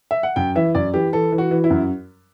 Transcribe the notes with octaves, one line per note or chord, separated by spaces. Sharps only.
E5
F#5
F#2 G5
E3 E5
F#2 D5
E3 G4
E3 A4
E3
F#4
E3
E4
F#2